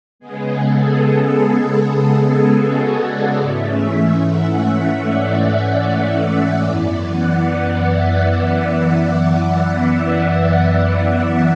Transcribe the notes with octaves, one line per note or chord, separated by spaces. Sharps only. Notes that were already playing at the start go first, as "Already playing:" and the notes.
C#3 G#3 B3 G#4
A4
A4
F#4
D5
G#2 E3 A3 C#4 E5
F#5
E5
D5
D5
F#2 E3 B3 D5
F#5
F#5
E5
E5